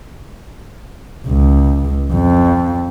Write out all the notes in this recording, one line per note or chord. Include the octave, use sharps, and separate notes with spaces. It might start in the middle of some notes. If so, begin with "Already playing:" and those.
C#2
F2